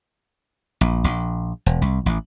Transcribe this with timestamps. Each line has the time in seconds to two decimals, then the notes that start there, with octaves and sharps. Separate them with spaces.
0.81 A#1
1.04 A#1
1.66 E1
1.82 C2
2.06 A1